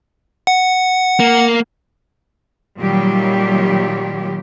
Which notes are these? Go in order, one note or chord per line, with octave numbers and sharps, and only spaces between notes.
F#5
A#3
A#2 D#3 F#3 G3 G4